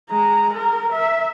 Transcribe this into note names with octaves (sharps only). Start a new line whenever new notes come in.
G#3 A#5
A#4
E5